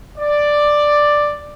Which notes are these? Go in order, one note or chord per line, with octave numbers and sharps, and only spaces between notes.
D5